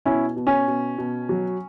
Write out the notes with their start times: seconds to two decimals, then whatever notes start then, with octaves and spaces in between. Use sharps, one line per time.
0.05 B2 C#4 E4
0.36 B2
0.47 C#4
0.67 B2
0.98 B2
1.29 F#3